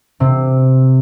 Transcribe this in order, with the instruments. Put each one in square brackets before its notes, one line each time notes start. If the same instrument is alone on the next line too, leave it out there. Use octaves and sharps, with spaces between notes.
[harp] C3